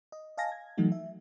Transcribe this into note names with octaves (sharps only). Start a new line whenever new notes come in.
D#5
D#5 F5 G#5 A5 A#6
G#6
E3 F#3 A3 D#4 F#4
E5